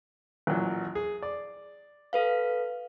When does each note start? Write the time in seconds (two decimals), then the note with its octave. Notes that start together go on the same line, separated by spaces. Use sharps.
0.47 A1 A#2 F#3
0.95 G#4
1.22 D5
2.13 A4 B4 F5